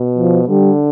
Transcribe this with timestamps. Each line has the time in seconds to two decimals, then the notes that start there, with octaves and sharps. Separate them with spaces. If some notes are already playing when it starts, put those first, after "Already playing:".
Already playing: B2
0.18 F3
0.49 D3 G3